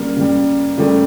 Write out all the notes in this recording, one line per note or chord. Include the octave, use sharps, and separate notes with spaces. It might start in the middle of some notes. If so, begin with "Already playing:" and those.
Already playing: C#3 G3 A#3
C#3 G3
C#3 G3 A3